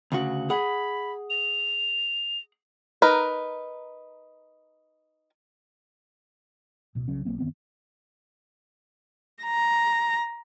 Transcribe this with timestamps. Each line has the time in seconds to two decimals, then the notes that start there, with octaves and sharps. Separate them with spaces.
0.12 D2 C#3 F#4
0.50 G#4 F#5 B5
1.30 F7
3.02 D#4 A#4 B4
6.95 D1 B2
7.08 C2 C#3 F#3 C#4
7.25 B1 F#3 A#3 C4
7.39 F#2 D#3 B3 C4
9.43 A#5